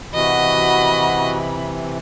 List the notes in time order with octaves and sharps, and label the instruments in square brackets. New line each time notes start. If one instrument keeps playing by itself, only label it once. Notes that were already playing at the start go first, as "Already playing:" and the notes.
[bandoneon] C3 E3 [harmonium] F#4 [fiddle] D#5 [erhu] B5